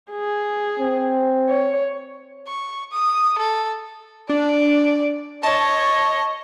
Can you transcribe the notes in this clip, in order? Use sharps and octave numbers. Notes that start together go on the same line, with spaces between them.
G#4
C4
C#5
C#6
D#6
A4
D4 D5
C#5 D#5 A5